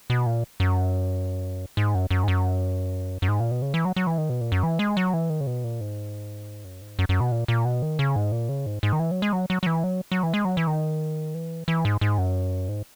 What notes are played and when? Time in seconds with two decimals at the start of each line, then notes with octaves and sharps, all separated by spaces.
0.10 B2
0.26 A#2
0.60 F#2
1.77 G#2
1.95 F#2
2.11 F#2
2.24 G#2
2.28 F#2
3.22 F#2
3.28 G#2
3.40 A#2
3.51 B2
3.62 C#3
3.74 E3
3.85 F#3
3.96 F#3
4.07 E3
4.18 D#3
4.30 B2
4.41 A#2
4.52 F#2
4.63 E3
4.79 G#3
4.97 F#3
5.14 E3
5.30 D#3
5.41 C#3
5.47 B2
5.64 A#2
5.81 G#2
6.65 F#2
6.82 G#2
6.99 F#2
7.09 F#2
7.20 B2
7.32 A#2
7.48 A#2
7.65 B2
7.82 D#3
7.99 C#3
8.16 G#2
8.32 A#2
8.49 C#3
8.66 G#2
8.83 G#2
8.93 D#3
9.00 E3
9.11 F#3
9.22 G#3
9.33 F#3
9.50 F#3
9.63 F#3
9.67 E3
9.84 F#3
10.12 F#3
10.23 E3
10.34 G#3
10.45 F#3
10.57 E3
10.67 D#3
11.34 E3
11.68 E3
11.85 G#2
12.01 G#2
12.18 F#2
12.69 G#2